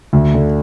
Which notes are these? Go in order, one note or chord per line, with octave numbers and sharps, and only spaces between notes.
D2
D3